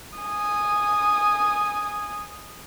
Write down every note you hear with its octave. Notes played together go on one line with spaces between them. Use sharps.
G#5 D#6